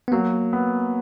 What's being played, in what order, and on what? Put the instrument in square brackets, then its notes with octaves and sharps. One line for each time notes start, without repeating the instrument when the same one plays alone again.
[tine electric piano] B3
[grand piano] F#3 [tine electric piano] A#3
[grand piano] B3